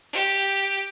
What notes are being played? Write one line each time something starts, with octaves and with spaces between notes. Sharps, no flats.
G4